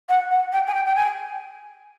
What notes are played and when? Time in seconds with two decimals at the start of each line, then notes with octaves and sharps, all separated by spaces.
0.09 F#5
0.31 F#5
0.52 G5
0.67 G#5
0.74 G5
0.86 G5
0.95 G#5